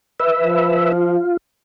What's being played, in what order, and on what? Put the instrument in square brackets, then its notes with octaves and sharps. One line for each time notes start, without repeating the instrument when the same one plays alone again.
[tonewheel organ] B4 E5
[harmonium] F3
[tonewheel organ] F4